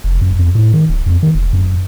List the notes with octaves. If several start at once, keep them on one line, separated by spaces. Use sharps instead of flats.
F1
F#2
F2
A2
D#3
D1
F2
D#3
E1
F#2